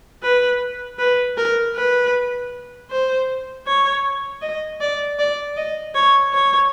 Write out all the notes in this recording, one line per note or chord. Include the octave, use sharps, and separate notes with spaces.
B4
B4
A#4
B4
C5
C#5
D#5
D5
D5
D#5
C#5
C#5